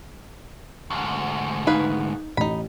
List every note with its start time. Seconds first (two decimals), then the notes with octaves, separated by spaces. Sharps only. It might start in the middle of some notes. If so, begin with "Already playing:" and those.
0.90 D2 G#2
1.67 D#4 G#4 B4 F5
2.37 A1 D#4 B5